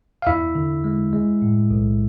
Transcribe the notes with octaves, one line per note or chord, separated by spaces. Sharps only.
F5
E2 E4 E5
D3
G#3
G#3
A2
B1